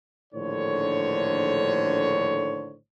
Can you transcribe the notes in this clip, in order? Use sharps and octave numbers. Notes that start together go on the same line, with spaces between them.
A#1 A2 D3 D#3 C5 C#5